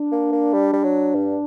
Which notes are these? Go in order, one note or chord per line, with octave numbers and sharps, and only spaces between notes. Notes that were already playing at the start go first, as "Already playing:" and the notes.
Already playing: D4
A#3
A#3
G3
G3
F#3
G2